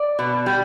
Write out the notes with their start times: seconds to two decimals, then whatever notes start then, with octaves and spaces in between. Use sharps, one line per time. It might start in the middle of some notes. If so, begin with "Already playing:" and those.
Already playing: D5
0.19 B2
0.46 G3